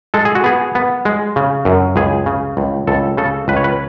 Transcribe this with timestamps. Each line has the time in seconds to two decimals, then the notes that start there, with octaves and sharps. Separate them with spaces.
0.14 G#3 A4
0.25 G#4
0.35 F#4
0.44 B3 G#4
0.75 B3
1.05 G#3
1.36 C#3
1.65 F#2
1.96 C#2 G#4
2.26 C#3
2.57 C#2
2.87 C#2 A4
3.17 C#3 A4
3.48 C#2 B4
3.56 C#5
3.64 B4